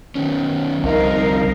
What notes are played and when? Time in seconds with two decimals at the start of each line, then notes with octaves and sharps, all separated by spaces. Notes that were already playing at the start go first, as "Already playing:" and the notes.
0.15 D#3 B3 C#4
0.84 C2 D3 F3 C4 D#4 A#4 F5